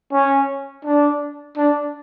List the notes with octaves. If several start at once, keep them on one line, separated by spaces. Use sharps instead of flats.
C#4
D4
D4